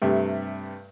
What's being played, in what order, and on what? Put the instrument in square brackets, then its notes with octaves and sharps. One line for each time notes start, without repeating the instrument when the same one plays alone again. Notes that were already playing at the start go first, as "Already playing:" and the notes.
[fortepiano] G2 C3 A3